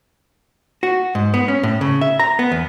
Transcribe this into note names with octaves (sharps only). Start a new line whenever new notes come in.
F#4
G#2
B3
C#4
A2
C#3
E5
A#5
B3
E2